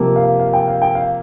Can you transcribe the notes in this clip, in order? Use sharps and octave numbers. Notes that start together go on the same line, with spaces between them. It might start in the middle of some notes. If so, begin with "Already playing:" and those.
Already playing: C3 F3 A#3
F5
F5
G5
F5
G5
F5